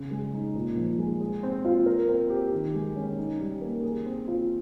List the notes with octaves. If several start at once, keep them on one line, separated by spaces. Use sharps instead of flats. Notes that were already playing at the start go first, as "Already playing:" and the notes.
Already playing: C#3
G#3
D#4
A#2
F3
G#3
G#4
C4
F4
A#4
C4
G4
D#3
G#3
C#4
D#4
G3
A#3
G#4
C4
F4